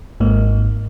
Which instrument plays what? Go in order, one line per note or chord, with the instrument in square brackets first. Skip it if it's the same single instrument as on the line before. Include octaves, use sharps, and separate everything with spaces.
[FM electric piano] G#1 G#2 A#3